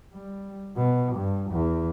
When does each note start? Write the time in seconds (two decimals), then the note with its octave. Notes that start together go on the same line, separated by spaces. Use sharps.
0.13 G3
0.77 B2
1.16 G2
1.51 E2